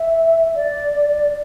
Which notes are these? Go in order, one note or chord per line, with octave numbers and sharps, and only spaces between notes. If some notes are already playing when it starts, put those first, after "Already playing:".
Already playing: E5
D5